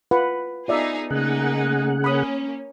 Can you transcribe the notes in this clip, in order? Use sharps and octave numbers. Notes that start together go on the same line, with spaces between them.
F4 B4 F#5
B3 D#4 F4 G#4 D5 E5
C#3 A3 A#3 D#4 G#4 F#5
A#3 C#4 B5 D#6